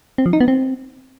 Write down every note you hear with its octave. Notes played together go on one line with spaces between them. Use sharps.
C4
F3
D#4
B3
C4